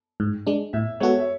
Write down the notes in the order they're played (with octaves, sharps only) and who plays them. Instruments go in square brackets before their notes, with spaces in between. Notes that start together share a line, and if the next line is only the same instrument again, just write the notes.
[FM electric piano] G#2
G#3 D4
[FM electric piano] A2 [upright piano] E5
[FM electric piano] G#3 B3 F#4 A4 [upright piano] C#5
[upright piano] E5